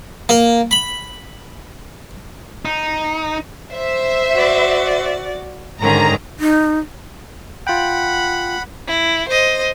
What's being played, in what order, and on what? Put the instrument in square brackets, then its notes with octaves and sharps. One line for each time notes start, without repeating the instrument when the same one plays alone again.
[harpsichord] A#3
B5
[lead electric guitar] D#4
[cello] C5 [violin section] E5
[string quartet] F#4 D5
[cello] G#2 [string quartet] D3 D#3 C#4 [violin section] A#5
[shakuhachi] D#4
[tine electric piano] F4 G5 [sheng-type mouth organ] F#5 B5
[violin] E4
C5 D#5